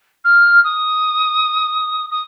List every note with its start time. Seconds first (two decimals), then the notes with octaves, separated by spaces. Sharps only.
0.24 F6
0.64 D#6
2.10 D#6